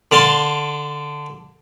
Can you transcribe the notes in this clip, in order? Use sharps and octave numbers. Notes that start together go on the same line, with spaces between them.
D3 F5 A5 C6